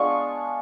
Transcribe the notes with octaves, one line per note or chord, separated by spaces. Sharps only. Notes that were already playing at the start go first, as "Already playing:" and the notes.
Already playing: G#3 B3 D4 F4 C#6